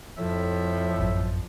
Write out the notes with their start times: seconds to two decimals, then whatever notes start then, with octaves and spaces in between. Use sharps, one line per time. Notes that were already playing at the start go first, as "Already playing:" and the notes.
0.18 F2 A2 F3 E5
0.99 A1 F#2